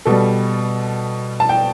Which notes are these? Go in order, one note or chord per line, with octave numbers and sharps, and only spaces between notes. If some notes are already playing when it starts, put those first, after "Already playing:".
B2 G3 A4
A5
G5